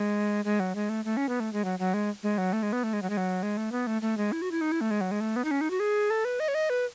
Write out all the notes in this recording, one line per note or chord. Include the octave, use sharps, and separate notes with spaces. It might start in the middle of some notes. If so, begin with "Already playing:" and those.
Already playing: G#3
G#3
F#3
G#3
A3
A3
C#4
B3
A3
G#3
F#3
F#3
G#3
G#3
F#3
A3
G#3
B3
A3
G#3
F#3
G#3
F#3
G#3
A3
B3
A3
A3
G#3
E4
F#4
E4
D#4
E4
A3
G#3
F#3
G#3
A3
B3
D#4
C#4
D#4
F#4
G#4
A4
B4
D#5
C#5
D#5
B4